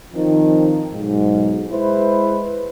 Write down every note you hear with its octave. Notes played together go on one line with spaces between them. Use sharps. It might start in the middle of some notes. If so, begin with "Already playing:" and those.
D#3 F3 C4 D#4
B1 G#2
G#3 E4 B4 C5